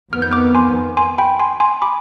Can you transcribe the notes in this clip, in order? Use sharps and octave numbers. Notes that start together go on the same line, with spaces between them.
F2 D#3 B3 F6
G6
D6 F6
G#5 C6
G#5 C6
G5 B5
G#5 C6
G#5 C6
B5 D6